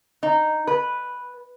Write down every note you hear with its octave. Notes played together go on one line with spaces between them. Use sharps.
D#4
B4